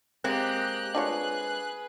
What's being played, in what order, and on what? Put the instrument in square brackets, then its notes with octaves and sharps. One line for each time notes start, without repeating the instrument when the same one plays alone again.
[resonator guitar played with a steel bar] G#3 A#3 C4 [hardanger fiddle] G4 D#5 [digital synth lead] F#6
[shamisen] D4 F4 C#5 [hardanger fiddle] G#4 B4